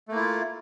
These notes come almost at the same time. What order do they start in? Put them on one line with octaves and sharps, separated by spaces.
A3 A#3 E4 F4